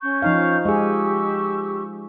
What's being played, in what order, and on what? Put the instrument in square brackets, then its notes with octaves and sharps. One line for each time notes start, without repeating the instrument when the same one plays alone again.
[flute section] C#4 C#6 G6
[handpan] F3 D#4 F5
[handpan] G#3 G#4 [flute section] G4 C#6 E6